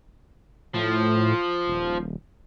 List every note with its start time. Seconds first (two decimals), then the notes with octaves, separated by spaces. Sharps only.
0.74 A2 F3
1.67 D#1